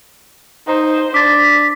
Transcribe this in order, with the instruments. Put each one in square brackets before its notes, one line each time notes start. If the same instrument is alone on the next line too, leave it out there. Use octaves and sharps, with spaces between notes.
[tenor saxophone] D#4 [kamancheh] C5
[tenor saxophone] D4 [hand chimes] D6 A6 [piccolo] B6